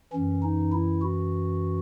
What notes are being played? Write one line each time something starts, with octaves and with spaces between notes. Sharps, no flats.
F#2 E3 C#4
D#4
E4
F#4